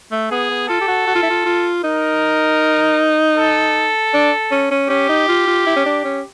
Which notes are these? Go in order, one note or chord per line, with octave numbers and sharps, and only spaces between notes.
A3
B3 G#4
B3
F4 A4
G4
F#4
F#4
F4
E4
F4
F4
D#4 A#4
A4
D4
C#4
C#4
C#4 G4
D#4
F4
F4
E4
C#4
D4
C#4